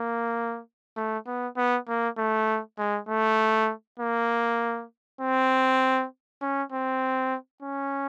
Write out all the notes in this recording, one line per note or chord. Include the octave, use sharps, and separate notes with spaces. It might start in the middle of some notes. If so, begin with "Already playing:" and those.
Already playing: A#3
A3
B3
B3
A#3
A3
G#3
A3
A#3
C4
C#4
C4
C#4